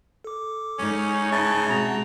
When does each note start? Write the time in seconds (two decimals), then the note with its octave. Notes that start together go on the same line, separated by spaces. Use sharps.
0.24 A4 D6
0.78 G#2 C#4 D#4 C#5
1.32 C#3 E5 G#5 A5 B5
1.70 B2 G#3 C4 F#4 G#4 A#5